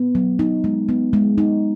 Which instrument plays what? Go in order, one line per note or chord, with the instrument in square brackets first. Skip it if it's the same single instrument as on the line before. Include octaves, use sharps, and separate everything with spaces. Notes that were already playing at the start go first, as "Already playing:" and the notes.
Already playing: [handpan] B3
F#3
D#4
G#3
B3
G#3
D#4